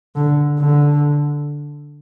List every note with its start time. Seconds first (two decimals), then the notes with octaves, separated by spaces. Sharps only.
0.15 D3
0.59 D3